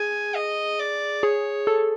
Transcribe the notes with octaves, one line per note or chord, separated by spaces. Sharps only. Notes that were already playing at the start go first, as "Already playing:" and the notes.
Already playing: G#4 G#5
D#5
D5
G#4 C#5
A4